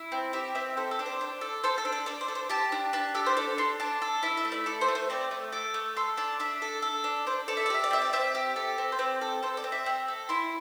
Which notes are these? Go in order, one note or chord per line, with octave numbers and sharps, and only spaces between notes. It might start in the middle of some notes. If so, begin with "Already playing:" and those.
Already playing: E4
C4
G4 E5
C4 E5
A4 C5
A4
D4
C5
D4
A4
A4 C5
A4
D4
A4
D4 D5
C5
A4
C5
G4 A5
D4
D4 A5
G4 A4
C5
A4 D5
D4 C6
D4 A5
A4
E4 E5
E5
A3
D5
A4 D5
C5
A3
C5
C4 D5
A3
A4 D6
A3
A4 C6
D4 A5
D4 E5
A4
A4
D4
D4 C5
A4 D5
E5
D5
G4 E5
D5
C4 E5
D5
C4 E5
G4
A4
C4
C5
C4 D5
A4
A4 C5
D5
C4
E5
C4
A4
E4 C6